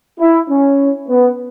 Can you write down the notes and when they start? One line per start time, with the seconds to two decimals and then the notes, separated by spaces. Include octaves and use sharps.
0.19 E4
0.49 C#4
1.09 B3